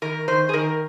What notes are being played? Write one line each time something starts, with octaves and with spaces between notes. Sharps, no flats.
D#3 A#4
D#3 C5
G#4
D#3 A#4